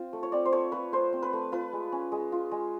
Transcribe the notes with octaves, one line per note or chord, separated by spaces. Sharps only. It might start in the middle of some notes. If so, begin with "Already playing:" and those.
Already playing: C4 F4
A3
C#5
C4 D5
C5
A3 C#5
F4 B4
A3 C5
C4
B4
A3
F4 B4
G#3
C#4
G#3
F4
G#3